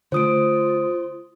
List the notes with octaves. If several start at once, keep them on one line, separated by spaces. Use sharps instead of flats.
D3 A3 F4 C5 D#6 D7